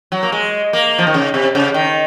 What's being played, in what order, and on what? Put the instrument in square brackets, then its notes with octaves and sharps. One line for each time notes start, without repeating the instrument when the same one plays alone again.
[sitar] F#3
A#3
G#3
A#3
F3
D#3
C#3
C3
C#3
D#3